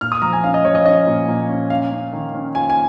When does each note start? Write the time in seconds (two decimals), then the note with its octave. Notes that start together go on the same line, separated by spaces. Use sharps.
0.01 A#2 F6
0.12 D#6
0.22 F3 A#5
0.33 G#5
0.43 C#4 F5
0.54 D#5
0.65 F3 C#5
0.75 D#5
0.85 C#4 D#5
1.07 A#2
1.28 A#2
1.49 C#4
1.70 C#4 F5
1.92 C#4
2.13 D#3
2.34 C#4
2.55 F4 G#5
2.70 G#5